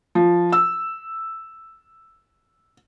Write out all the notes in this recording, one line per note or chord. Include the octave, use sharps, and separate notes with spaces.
F3
E6